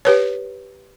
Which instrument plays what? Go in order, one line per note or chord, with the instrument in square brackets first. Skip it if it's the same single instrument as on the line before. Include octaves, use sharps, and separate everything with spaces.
[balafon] G4 B4 C#5